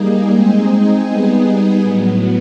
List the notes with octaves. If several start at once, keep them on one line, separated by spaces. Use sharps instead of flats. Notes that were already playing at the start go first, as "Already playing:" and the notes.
Already playing: G3 A#3 D#4 G#4
G#3 C4 D#4 G#4
G3 B3 D#4 G#4
A2 F#3 B3